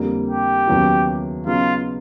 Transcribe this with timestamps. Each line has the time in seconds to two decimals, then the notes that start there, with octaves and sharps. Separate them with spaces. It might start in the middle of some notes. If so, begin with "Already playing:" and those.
Already playing: F2 D3 G3 A#3
0.28 G4
0.67 D#2 C#3 F#3 B3 E4
1.46 C#3 F#3 B3 D#4 F4